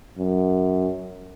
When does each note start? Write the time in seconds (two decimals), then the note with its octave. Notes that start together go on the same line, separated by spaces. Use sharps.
0.18 F#2